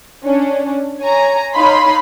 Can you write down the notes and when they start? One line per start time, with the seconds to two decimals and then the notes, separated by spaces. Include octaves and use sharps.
0.24 C#4 D4
1.01 C#5 G#5 A#5
1.55 D#4 C#5 D#5 F5 B5 C6